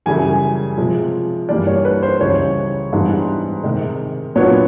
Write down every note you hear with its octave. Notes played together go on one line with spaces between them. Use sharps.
F#2 C#3 E3 G3 G#5
C3 F3 G#3
G2 E3 G3 A#3 D5
C#5
B4
C5
C#2 C#3 E3 G3 C#5
G#2 E3 G3 B3 D4
C3 D#3 G#3
A#2 F#3 B3 D4 C#5